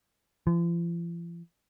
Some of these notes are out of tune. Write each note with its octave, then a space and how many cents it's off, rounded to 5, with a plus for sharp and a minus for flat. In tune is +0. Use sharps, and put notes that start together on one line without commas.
F3 -45